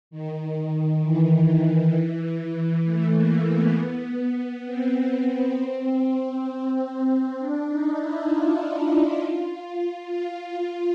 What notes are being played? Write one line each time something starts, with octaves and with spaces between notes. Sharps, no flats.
D#3
E3
A3
A#3
B3
B3
C4
D4
D#4
E4
F4
F4
F4